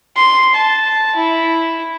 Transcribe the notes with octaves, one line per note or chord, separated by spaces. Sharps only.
C6
A5
E4